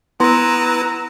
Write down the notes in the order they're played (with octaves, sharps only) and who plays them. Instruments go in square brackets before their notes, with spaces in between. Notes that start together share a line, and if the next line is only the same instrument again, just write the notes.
[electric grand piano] B3 [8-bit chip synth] E4 B4 [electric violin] A#5 E6 [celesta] C6